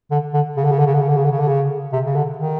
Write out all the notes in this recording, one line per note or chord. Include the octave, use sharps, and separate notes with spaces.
D3
D3
C#3
D3
C#3
D3
C#3
D3
C#3
D3
C#3
D3
C#3
D3
C#3
C3
C#3
D3
D#3